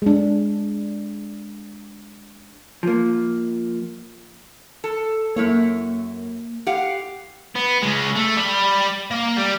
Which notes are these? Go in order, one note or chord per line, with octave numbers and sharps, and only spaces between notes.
G#3 D4
F3 A#3
A4
F#2 A#3 E4 C#5
G4 F5 F#5
B3
C#3 G#3
A3
G3 B5
A#3
G3